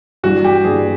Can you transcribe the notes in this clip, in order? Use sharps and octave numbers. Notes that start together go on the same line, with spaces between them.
G2 E3 G3 F#4
G4
G2 E3 G3 G#4